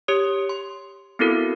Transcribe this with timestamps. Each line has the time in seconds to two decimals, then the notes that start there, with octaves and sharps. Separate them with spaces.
0.08 G4 C#5 D#6
0.49 C6
1.19 B3 C4 E4 F#4 A4 A#4